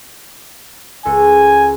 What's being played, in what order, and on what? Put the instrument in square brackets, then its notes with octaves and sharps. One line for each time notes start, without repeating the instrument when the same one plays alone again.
[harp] C#2 A4 [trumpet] G#5